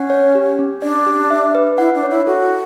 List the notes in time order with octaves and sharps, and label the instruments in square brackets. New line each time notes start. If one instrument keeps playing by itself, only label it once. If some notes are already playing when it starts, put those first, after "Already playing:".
Already playing: [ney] C#4 [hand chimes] F#5
[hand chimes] C#5
G4
C#4
[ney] D4 [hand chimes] D5
[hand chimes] G4
E5
B4
[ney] E4 [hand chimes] F#5
[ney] D4
[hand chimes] C#5
[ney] E4
[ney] F#4 [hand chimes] A4